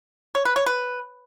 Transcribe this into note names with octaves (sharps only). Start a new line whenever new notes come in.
C#5
B4
C#5
B4